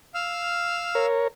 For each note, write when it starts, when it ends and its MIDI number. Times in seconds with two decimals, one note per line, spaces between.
0.14 1.06 77
0.14 1.06 88
0.14 1.06 89
0.95 1.28 70
0.95 1.28 73